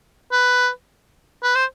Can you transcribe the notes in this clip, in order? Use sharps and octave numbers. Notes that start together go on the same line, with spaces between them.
B4
B4
C5